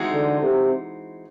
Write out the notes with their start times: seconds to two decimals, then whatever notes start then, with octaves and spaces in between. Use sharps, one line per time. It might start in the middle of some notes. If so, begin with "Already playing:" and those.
Already playing: E3 G#3 C4 D#4 F#4
0.12 D3
0.41 C3